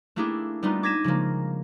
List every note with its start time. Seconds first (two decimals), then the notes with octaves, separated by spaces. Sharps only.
0.16 A3 A#3 D4 E4 G4 G#4
0.63 G3 A3 B3 D4 D#4 F4
0.83 D6 G#6 A#6 B6 D#7 E7
1.04 C#3 F3 G#3 A#3